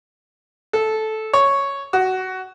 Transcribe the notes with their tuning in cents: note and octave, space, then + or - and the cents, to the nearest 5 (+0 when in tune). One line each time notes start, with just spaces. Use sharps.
A4 -10
C#5 +0
F#4 +15